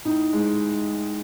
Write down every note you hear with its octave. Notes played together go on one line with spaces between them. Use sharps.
A2 D#4
G#3